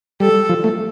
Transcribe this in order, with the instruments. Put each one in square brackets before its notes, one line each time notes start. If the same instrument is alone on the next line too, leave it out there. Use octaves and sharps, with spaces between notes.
[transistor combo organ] G3 [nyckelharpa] A4
[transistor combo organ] F3
A3